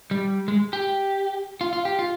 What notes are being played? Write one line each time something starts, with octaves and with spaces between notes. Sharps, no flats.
G3
G#3
G4
F4
F4
G4
F4